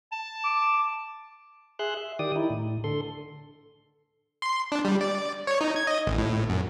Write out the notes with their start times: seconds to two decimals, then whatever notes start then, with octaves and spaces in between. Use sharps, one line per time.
0.12 A5
0.44 D6
1.79 G#4 E5 C6 F#6
1.97 E5
2.19 D#3 G4 D5 D#6
2.36 D#4 E4
2.50 A2
2.84 D3 A4 C6
4.42 C6
4.72 D4
4.85 G3
5.01 D5
5.47 C#5
5.61 D#4
5.76 G#6
5.87 D#5
6.07 A1
6.18 A2
6.50 F#2